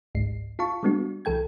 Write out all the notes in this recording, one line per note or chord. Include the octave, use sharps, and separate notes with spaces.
G#1 C#2 G#2 C7
F4 F5 A5 C#6
G3 G#3 B3 D4 F#4
C2 E3 A4 G5 G#6